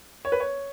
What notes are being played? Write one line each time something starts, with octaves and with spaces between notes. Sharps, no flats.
C#5
B4
C#5